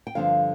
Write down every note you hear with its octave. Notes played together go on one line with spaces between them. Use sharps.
G5
G2 D3 F3 C4 F5